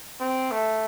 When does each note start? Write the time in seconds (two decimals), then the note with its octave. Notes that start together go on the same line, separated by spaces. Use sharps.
0.20 C4
0.52 A3